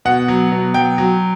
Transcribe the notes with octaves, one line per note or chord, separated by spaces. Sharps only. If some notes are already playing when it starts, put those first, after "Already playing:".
B2 F#5
F#3
B2
F#3 G5
F#3